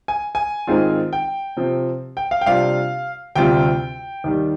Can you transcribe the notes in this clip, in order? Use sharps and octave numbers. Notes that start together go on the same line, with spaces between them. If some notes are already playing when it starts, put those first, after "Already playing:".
G#5
G#5
G#2 D#3 G#3 C4 F4
G5
C3 F3 C4
G5
F5
G5
C3 G3 D4 F4 F5
D2 C3 G3 C4 F4 G5
D#2 D#3 G3